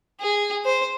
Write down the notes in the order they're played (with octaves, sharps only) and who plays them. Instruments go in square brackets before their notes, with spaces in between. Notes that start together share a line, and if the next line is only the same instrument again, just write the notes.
[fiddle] G#4
C5